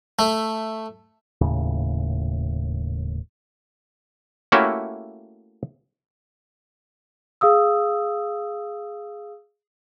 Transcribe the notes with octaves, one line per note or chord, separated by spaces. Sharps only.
A3
D#1 D#2 A2 C#3
A3 A#3 C#4 E4 F#4 G4
G#4 F5 D#6 E6